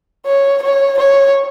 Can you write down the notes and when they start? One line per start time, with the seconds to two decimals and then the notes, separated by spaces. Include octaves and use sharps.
0.26 C#5
0.63 C#5
0.98 C#5